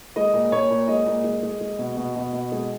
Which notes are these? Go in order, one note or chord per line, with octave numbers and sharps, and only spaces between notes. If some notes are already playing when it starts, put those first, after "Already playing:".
G#3 D#5
A#2
A#2 C#5
A#2
G#3 D#5
A#2
G#3
G#3
G#3
B2
B2
B2
B2
G#3